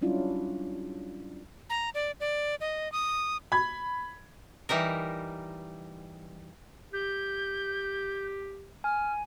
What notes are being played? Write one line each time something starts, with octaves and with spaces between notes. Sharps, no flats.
F#3 G3 C#4 D4 E4 F4
A#5
D5
D5
D#5
D#6
B5 G#6
E3 G3 D#4 A#4
G4 G6
G#5 F6